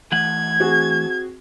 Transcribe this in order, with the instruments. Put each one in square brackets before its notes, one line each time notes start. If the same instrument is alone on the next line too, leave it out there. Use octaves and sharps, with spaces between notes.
[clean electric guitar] E3 A3 F#5 [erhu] G#6
[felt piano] C4 F#4 G#4